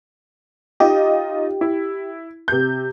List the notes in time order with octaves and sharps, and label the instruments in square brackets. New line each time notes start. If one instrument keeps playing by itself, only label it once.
[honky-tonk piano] D#4 F4 D#5 [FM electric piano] G4
[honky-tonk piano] E4
C3 G6